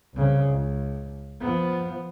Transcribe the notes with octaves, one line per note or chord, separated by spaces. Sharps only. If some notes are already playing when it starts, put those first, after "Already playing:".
C2 C#3
C#2
F3 B3